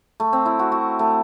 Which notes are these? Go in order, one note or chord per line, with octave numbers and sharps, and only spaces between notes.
A3
C4
E4
F#4
F#4
A3